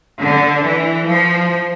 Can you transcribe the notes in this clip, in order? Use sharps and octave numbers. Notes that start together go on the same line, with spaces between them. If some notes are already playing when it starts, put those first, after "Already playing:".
D3
E3
F3